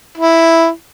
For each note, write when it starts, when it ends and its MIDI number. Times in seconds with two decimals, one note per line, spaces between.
0.18 0.68 64